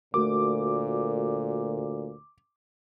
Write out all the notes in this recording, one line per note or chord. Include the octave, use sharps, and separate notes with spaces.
D2 A#2 A3 F#4 A#4 D6